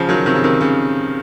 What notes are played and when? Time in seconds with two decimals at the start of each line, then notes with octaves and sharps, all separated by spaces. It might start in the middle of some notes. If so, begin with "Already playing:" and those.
Already playing: C#3 F3
0.09 D#3 F#3
0.26 C3 D#3
0.35 C#3
0.44 C3 D#3
0.61 C#3